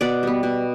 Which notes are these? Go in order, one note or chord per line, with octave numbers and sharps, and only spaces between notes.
B2 D5 F#5
G3 B3
B2